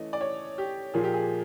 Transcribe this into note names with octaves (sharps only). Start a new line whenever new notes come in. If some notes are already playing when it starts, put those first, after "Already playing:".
Already playing: E3 A3 C#4 D#5
D5
C#5
G4
A#2 F3 A#3 G#4
G4
G#4